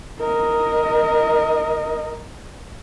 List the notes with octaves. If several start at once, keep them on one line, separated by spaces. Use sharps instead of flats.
A#4 D#5